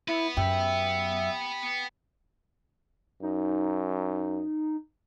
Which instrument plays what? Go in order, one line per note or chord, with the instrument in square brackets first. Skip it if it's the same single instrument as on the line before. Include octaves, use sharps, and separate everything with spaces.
[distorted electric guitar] B3 B4 [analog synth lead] E4
[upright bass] F#2 [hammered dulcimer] G4 [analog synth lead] E5
[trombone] F#2 [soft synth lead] D#4